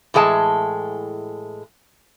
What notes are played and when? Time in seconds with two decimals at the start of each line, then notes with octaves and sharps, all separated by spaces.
0.14 A2 E3 G#3 E5 A5